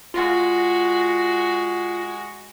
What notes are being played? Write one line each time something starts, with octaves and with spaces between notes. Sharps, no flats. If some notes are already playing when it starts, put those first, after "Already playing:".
G#3 F4 F#4